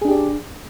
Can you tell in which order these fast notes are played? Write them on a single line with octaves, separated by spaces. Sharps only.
G#4 D4 G4 D5